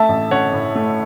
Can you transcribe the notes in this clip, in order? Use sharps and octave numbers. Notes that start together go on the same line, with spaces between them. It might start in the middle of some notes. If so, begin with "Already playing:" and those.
Already playing: A3 E5 A5
A1
C#4 C#5 F#5
A2
A3